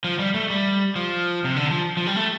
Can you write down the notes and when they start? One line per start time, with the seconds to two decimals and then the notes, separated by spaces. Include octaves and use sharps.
0.04 F3
0.19 G3
0.34 A3
0.50 G3
0.96 F3
1.45 C3
1.56 D3
1.71 F3
1.97 F3
2.07 G3
2.16 A3